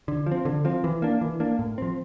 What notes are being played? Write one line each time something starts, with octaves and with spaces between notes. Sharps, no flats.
D3
F3
C4
D3
F3 C4
E3
A#3 D4
E3
A#3 D4
A2
F3 C4